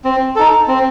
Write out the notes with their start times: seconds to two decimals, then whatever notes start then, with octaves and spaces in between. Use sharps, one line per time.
0.05 C4
0.36 D#4 A4
0.68 C4